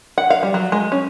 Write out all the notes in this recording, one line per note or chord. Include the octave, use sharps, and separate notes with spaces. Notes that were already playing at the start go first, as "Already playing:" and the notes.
F#5
F5
G3
F#3
G#3
C#4